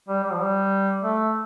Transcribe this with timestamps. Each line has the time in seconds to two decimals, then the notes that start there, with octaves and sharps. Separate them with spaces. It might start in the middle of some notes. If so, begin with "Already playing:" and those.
0.09 G3
0.23 G3
0.32 F3
0.41 G3
1.02 A3